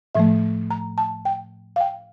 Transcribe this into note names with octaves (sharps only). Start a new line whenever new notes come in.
A2 F3 A3 E5
A#5
A5
G5
F5
G5